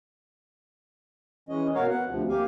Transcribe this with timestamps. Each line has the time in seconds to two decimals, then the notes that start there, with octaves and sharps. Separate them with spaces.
1.49 E3 G#3 C#4 D#5
1.75 B2 F#4 A#4 C#5 F5
1.89 B3 F#5
2.09 D2 C3 F3
2.29 A#3 G4 F5 G#5